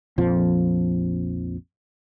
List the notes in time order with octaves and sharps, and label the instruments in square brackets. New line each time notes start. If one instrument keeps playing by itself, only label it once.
[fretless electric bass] A#1 F2 F3